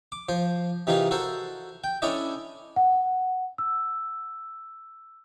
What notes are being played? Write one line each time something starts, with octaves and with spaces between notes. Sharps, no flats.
D6
F3 C5
C3 E3 D#4 F4 G#4 A#4
F#4 A4 A#4 C5 A5
G5
C#4 D4 E4 A4 D5 D#5
F#5
E6